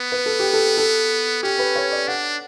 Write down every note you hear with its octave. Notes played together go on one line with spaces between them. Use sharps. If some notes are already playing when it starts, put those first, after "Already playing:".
Already playing: B3 B4
B4
A4
G4
A4
A4
C#4 G4
B4
C#5
D5
D4 F#5